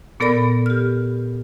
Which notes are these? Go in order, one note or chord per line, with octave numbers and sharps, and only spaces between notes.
A#2 B3 A4 A#4 D5 B5
G4 F6